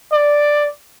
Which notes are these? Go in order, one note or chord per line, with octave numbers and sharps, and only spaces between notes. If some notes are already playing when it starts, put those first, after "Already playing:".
D5